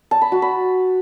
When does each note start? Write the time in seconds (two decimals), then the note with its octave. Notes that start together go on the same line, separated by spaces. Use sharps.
0.11 A5
0.22 B5
0.32 F#4
0.42 B5